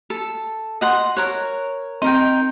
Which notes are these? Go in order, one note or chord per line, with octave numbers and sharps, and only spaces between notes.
A4
D#5 F#5 C6
A#4 C#5 F#6
C4 D#4 A#4 G5